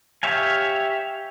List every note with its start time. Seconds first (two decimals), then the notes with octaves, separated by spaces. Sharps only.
0.23 G4 C#5 E5 F5 G#5